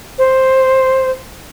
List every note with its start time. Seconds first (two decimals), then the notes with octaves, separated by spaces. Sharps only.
0.18 C5